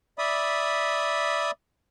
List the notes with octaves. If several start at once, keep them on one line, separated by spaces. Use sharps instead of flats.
D5 E5 B5 D#6